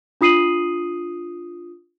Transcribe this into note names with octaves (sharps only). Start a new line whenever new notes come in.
D4 F4 D#6 C7 D#7 F#7